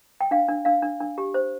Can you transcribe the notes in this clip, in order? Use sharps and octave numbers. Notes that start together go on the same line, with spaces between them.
G5
D4 F5
D4
D4 F5
D4
D4
G4
C5